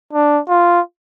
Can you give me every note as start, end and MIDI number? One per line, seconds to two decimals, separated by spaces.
0.13 0.40 62
0.49 0.81 65